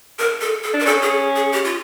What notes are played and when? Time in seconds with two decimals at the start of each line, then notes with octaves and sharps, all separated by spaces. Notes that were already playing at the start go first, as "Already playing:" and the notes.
0.19 A#4
0.41 A4
0.64 A4
0.74 D4
0.80 A#4
0.86 C#4 A4
1.02 G#4
1.36 G#4
1.53 G4
1.65 F4